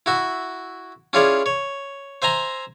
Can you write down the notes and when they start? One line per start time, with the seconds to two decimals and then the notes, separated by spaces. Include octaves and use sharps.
0.06 E4 F#4 E5
1.13 C#4 E4 F4 G#4 C#5 D5
1.46 C#5
2.22 C5 E5 G#5 A#5 C6